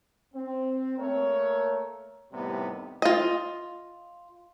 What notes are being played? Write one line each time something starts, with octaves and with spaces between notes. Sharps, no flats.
C4
A3 A#3 A#4 C#5
D#2 A2 C3 D#3 G3 B3
F4 D#5